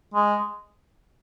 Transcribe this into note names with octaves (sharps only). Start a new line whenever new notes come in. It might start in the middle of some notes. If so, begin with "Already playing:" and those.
G#3